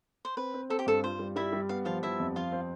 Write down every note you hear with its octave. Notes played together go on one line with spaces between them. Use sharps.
C5
C4 B4
C4
C4 A4
G4
G2 A4
F4 C5
G3
G3 E4 E5
G3
B3 F5
F3 F4 F5
F3 E4 E5
F2
F3 F4 F5
C4